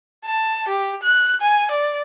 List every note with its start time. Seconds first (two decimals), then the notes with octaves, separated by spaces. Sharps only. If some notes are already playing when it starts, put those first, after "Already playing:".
0.25 A5
0.68 G4
1.03 F#6
1.41 G#5
1.71 D5